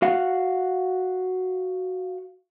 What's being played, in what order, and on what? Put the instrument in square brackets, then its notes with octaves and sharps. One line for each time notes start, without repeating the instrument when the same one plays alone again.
[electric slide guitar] F#4 F5 F#5